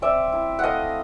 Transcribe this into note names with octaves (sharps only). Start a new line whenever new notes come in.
C4 D5 E5
E4
A3 D#5 F5 F#5